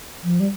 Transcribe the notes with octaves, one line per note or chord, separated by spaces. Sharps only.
F3
G3